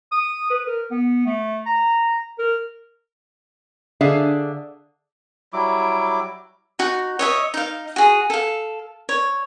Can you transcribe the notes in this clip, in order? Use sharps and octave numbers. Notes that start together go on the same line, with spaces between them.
D#6
B4
A#4
B3
A3
A#5
A#4
D3 D4 G#4 E5 F5
F#3 G3 E4 D6
D#4 F#4
C#5 D#5 E5
D#4 F5
F#4 G#4
A4 F5
C#5